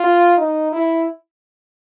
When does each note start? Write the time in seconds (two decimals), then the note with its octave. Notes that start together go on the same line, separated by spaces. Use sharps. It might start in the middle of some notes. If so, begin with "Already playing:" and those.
Already playing: F4
0.38 D#4
0.72 E4